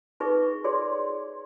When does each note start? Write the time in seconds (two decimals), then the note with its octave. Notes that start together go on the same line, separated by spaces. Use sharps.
0.20 D#4 G#4 B4 E5 C#6
0.64 F#4 G#4 C#5 D5 C6